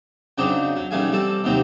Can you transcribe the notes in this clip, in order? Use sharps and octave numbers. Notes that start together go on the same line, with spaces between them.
C#3 F#3 C4 D4 D#4
F#3
B1 C#3 G3 A3 F5 G#5
G3 C4 A4
D#2 C3 F#3 C4 D#4